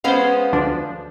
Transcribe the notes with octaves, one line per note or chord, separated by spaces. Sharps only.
G#3 B3 C#4 C5 F5
D2 F3 D4